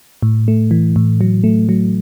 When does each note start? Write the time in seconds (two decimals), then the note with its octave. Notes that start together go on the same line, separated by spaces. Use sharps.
0.23 A2
0.48 A3
0.71 E3
0.96 A2
1.21 F#3
1.44 A3
1.69 F#3